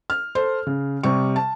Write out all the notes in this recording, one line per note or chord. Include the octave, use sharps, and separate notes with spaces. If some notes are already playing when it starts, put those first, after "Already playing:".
F6
A4 C5
C#3
C3 G3 C#6
A5